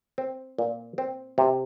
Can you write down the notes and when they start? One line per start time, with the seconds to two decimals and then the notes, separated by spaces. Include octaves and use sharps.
0.18 C4
0.58 A#2
0.98 C4
1.38 C3